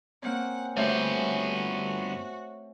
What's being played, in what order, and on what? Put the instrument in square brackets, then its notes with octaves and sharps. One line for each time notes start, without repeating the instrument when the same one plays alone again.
[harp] A#3 C4 C#4 [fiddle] F#5
[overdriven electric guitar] G2 B3 [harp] A3 C#4 C5 [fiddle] F#4 [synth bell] C#5 E5